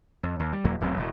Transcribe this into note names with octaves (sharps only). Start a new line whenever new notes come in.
F2
D#2
G3
E1 E2 F#3 A#3
D#1 A1 F#3 C4
E1 A2